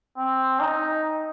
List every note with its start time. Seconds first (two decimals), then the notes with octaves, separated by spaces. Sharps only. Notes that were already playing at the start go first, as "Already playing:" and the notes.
0.18 C4
0.61 D#4